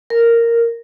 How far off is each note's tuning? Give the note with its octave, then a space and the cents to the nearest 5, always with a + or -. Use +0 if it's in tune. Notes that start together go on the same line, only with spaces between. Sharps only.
A#4 -5